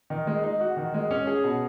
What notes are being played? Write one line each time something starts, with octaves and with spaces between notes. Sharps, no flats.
D#3
G#3
D#4
F#4
D#3
G#3
C#4
G#4
B2